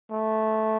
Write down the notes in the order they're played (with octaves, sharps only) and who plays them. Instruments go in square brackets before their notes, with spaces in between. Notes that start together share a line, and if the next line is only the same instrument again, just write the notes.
[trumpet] A3